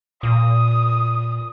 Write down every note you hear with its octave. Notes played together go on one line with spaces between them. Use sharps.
A#2 D#6